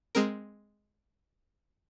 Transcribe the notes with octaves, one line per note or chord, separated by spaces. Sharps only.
G#3 C4 A#4